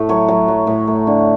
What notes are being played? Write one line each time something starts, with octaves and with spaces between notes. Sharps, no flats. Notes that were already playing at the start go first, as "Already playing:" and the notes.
Already playing: A2 A3
F#3 C#5
F#3
F#3
A2
A3
D3